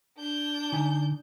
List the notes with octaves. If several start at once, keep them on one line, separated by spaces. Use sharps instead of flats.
D4 G6
D3 D#4 G#5